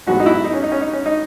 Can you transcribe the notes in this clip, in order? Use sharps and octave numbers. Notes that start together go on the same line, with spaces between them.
A1 G#2 F#3 B3 F#4
D#4
E4
D#4
C#4
D#4
C#4
D#4
C#4
D#4